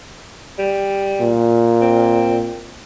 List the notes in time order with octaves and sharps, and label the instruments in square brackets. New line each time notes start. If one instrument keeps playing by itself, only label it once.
[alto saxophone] G3
[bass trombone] A#2
[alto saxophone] C4